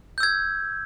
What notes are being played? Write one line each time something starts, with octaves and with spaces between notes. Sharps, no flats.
E6 G6 G#6